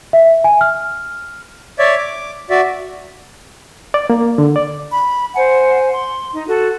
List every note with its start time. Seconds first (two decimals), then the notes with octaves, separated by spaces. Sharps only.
0.13 E5
0.44 G#5
0.61 F6
1.79 C#5 D5 E5
1.98 D6
2.50 F#4 D5 E5
3.94 D5
4.10 A#3
4.38 D3
4.56 D5
4.92 B5
5.35 C5 F#5 G#5
5.92 C6
6.34 D#4
6.48 F#4 A4